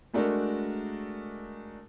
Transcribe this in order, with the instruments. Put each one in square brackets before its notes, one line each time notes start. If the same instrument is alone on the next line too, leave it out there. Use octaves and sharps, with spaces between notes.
[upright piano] G#3 A3 D4 F#4 A#4